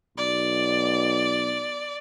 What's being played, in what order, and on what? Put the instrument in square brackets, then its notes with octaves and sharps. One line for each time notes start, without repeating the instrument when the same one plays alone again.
[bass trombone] B1 [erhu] D5